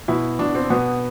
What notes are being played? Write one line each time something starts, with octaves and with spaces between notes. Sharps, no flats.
B2 E4
B2 D4
C4
B2 B3